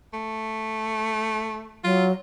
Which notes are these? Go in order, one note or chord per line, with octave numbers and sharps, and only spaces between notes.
A3
F#3 F4